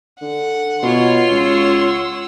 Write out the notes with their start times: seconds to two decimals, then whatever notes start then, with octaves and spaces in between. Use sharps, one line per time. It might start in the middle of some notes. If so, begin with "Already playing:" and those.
0.21 D3 F#5
0.82 B2 F4 C#5 C6
1.31 C#2 F#5 E6